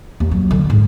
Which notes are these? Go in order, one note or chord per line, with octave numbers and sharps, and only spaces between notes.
D#2
F#3
D3
G#2